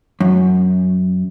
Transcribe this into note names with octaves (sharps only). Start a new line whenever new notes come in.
F#2